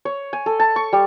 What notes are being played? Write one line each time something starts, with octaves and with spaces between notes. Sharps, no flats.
C#5
G#5
A4
A5
C#6
G3